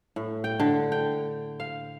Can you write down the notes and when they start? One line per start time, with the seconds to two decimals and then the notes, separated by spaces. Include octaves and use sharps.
0.16 A2
0.44 G5
0.60 D3
0.92 G5
1.60 F5